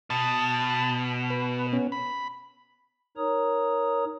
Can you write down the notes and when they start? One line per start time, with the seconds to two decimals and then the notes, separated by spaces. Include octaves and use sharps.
0.10 B2 A5
1.30 B4
1.73 B3 C#4
1.92 B5
3.17 D#4 A#4 C#5 A#5 D#6